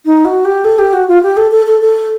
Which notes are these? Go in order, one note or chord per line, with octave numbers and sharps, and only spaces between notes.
D#4
F#4
G4
A4
G4
F#4
F4
G4
A4
A4
A4
A4